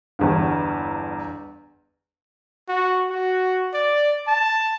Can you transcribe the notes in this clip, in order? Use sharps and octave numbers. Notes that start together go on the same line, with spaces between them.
G1 E2 G2
F#4
F#4
D5
A5